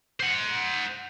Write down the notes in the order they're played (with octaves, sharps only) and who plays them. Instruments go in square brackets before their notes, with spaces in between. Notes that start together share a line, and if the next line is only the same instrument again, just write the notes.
[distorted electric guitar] C5 F#5